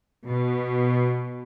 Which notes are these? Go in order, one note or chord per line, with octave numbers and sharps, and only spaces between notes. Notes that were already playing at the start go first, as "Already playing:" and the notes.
B2